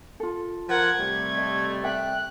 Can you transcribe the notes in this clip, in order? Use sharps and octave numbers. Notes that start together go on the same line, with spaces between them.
F4 A4
F3 A#4 F#5 G#6
C3 G3 A3
D#5
E5 G5 F#6